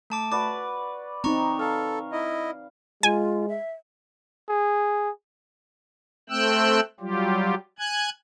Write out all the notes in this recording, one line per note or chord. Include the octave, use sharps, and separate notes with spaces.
A3 A5 D6
F#4 B4 D5 D6
C4 D#4 A#5 C#6
A4 F5
E4 D#5
G#3 F4 G#5
E5
G#4
A3 C4 G5 E6 F#6
F#3 G3 F4 G4
G#5 F#6 G#6